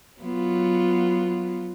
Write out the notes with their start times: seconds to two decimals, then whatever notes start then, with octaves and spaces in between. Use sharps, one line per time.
0.21 F#3 B3 F4